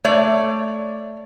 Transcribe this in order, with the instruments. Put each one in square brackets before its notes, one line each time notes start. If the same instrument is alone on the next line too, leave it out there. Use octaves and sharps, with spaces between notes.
[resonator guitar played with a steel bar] A3 C#5 D5